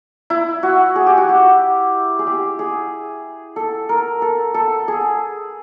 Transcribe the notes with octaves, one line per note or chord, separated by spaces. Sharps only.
E4
F#4
G#4
G4
F#4
G4
G#4
G4
G#4
A4
A#4
A4
A4
G#4